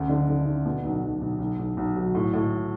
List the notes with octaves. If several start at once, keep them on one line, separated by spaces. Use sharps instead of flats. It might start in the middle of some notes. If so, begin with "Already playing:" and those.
Already playing: D2 C#3
D3
D3
D3
B2
B1
B1
B1
B1
B1
B1
F#3
A2
A2